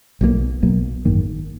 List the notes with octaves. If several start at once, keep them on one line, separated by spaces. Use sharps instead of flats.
B1 B2 F#3 A#3
B1 B2 F#3 A#3
G#1 F#2 D#3 A#3